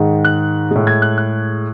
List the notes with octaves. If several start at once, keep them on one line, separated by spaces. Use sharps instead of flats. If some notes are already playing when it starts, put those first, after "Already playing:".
Already playing: G#2 D#3 G#3
F#6
A2 G#3
G#6
F#6
F#6